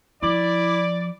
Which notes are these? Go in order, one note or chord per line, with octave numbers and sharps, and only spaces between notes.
F3 E4 D5